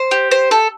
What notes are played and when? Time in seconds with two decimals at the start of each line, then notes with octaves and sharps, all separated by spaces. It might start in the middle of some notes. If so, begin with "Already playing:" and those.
Already playing: C5
0.11 G4
0.31 C5
0.51 A4